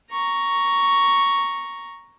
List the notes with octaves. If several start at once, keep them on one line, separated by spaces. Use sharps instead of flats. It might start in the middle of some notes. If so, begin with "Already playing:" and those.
A#5 C#6